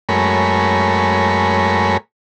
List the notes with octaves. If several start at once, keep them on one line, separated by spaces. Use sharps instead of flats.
F#2 G#3 A3 A#4 C#5 B5